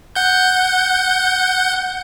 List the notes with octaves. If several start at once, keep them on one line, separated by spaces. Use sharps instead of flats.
F#5 G6